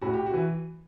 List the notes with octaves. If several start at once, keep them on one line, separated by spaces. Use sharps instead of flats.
A2 F#4
G4
F#4
E3